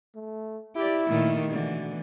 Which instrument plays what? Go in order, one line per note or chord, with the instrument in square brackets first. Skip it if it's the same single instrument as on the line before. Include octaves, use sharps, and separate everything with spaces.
[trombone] A3
[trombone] E4 [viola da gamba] G4 D5
[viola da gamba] A#2 D#3 A3
[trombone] B2 [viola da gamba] D3 E3